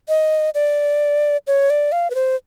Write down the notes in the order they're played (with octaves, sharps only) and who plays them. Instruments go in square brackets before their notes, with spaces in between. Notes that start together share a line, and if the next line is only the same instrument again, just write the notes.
[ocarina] D#5
D5
C#5
D5
F5
B4
C5